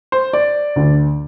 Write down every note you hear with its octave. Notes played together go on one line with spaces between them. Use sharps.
C5
D5
D2 D3